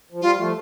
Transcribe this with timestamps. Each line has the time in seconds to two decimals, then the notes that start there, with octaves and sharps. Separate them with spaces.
0.12 F3
0.21 G3 F4
0.38 F3 A3